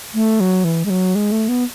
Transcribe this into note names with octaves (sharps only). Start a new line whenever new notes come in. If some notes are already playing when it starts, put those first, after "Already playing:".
A3
F#3
E3
G#3
F#3
G#3
A3
B3